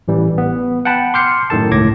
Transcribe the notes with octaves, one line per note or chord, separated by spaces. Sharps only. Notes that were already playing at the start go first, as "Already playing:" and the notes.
A1 E3 G3
B3
F#5 G5 A5 B5
C6 D6 F6 G6 C7 C#7
F#2 A2 D#3 A4 A5
G1 C#2 A2 D6 G#6 A#6